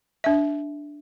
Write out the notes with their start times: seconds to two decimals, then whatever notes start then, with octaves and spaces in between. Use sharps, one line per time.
0.24 D4 E5